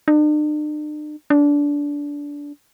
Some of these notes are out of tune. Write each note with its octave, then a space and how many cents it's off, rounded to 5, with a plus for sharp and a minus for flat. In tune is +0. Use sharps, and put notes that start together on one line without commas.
D4 +45
D4 -20